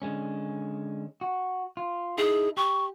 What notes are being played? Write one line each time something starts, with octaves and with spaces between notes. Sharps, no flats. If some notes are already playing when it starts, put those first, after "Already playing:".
D3 G#3 C#4
F#4
F4
D#4 E4 G#4 A4
G4 C#6